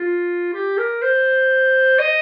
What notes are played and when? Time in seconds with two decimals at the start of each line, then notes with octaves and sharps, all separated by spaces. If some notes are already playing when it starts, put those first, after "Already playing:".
Already playing: F4
0.54 G4
0.78 A#4
1.02 C5
1.99 D#5